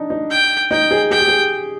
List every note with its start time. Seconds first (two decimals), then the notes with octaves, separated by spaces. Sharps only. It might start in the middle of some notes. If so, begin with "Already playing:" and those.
Already playing: D4 D#4
0.10 D#4
0.30 G5
0.71 D#4 G5
0.91 G#4
1.11 G#4 G5
1.20 G4
1.28 G#4